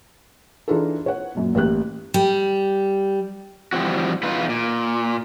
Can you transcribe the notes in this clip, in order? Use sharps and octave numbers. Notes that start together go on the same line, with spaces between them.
E3 D4 D#4 F4 G#4 A4
C#5 F#5
F#2 A#2
A1 A#3 G4 F#6
G3
E3 F3 G3 C4 F#4
E2 D#4 F4 B4
A#2